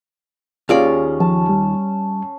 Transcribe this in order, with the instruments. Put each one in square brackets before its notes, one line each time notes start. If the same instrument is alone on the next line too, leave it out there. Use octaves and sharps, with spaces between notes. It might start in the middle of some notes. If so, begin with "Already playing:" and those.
[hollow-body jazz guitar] D#2 F4 D5 [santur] C#4 G#4
[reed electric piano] F3 [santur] A5
[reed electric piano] G3